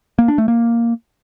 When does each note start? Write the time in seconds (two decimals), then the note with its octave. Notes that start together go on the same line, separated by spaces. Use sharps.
0.19 A#3
0.28 D4
0.38 A3
0.48 A#3